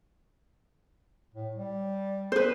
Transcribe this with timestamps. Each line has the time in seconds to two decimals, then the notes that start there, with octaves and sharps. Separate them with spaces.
1.34 A2
1.56 G3
2.32 B4 C5